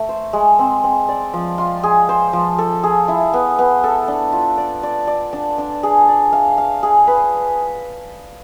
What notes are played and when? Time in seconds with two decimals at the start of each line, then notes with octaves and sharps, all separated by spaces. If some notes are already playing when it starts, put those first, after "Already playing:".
Already playing: A3
0.09 C5
0.33 G#3
0.59 C4
0.84 C4
1.09 D5
1.34 F3
1.58 F4
1.83 G#4
2.09 C5
2.33 F3
2.59 A4
2.83 G#4
3.08 E4
3.34 B3
3.59 B3
3.84 A4
4.08 D4
4.32 F4
4.58 D5
4.83 D5
5.07 D5
5.33 D4
5.58 D4
5.83 G#4
6.08 D5
6.33 F5
6.58 F5
6.83 G#4
7.07 B4